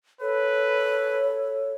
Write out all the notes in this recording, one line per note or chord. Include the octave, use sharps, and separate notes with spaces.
A4 B4 C#5